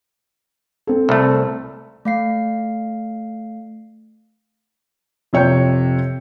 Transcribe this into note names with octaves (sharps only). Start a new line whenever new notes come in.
C4 A4
C2 A3
A3 F5 C7
F2 C3 C#5 G5 G6